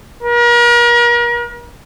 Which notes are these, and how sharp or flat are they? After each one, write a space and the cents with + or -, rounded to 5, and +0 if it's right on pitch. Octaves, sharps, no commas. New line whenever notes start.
A#4 +40